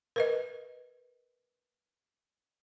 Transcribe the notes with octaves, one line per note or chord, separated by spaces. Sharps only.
A#4 B4 D#5